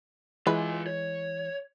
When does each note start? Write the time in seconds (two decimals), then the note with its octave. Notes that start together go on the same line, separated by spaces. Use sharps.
0.47 E3 G#3 F4 B4 G#5
0.86 C#5